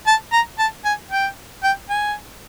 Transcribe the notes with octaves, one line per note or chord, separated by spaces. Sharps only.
A5
A#5
A5
G#5
G5
G5
G#5